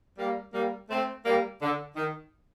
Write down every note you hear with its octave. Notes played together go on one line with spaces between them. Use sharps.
G3 A#3
G3 A#3
A3 C4
G3 A#3
D3
D#3